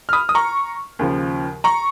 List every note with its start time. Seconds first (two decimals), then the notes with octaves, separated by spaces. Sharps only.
0.09 F6
0.13 B5 D#6
0.29 D#6
0.35 A#5 C#6
0.99 D#2 C#3 F3
1.64 A#5 C#6